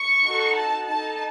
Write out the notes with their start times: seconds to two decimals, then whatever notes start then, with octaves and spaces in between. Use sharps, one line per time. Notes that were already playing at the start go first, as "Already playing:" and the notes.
Already playing: C#6
0.24 D#4 F#4 A4
0.55 A5
0.86 D#4 A4 A5